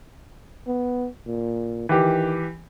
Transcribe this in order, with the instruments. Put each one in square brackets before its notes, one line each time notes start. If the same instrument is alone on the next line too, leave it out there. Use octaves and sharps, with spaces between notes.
[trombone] B3
A#2
[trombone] D#3 [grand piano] E3 G4